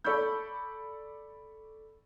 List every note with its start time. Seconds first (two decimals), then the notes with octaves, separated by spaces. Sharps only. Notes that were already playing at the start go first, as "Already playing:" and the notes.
0.04 A4 D5 B5 C#6 E6 G6